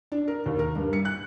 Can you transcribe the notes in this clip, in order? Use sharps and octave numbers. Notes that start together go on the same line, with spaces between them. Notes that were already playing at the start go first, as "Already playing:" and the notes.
D4
A#4
D#2
A#4
G2
C#7
F#6